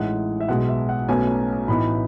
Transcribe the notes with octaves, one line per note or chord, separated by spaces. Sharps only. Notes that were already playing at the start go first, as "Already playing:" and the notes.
Already playing: A1 A2 G#3 D#4 F#5
E5
B1 B2 G#3 F#5
E5
F#5
B1 B2 A3 C#4 G#5
A1 A2 E3 B3 D#4 B5